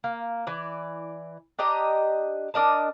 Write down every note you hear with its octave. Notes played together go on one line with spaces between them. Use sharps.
A#3
E3 D5
D4 G4 D#5 A#5
D4 A#4 D#5 A5